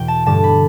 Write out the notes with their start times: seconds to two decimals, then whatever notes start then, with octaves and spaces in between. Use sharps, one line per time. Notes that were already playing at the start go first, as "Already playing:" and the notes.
Already playing: E2 B2 G5
0.08 A5
0.26 G2 D3 G3 A5
0.44 B5